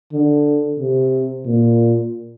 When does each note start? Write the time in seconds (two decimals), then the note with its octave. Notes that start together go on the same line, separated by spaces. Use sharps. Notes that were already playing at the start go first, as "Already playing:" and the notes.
0.13 D3
0.80 C3
1.46 A#2